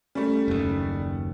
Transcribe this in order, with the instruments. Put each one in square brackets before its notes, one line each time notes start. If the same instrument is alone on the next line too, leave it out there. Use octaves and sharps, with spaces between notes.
[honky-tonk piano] G3 A3 [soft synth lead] C#4
[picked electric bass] F#1 D#2